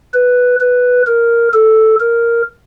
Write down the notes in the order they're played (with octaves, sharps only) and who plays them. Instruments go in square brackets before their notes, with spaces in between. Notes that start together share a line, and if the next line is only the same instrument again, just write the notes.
[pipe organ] B4
B4
A#4
A4
A#4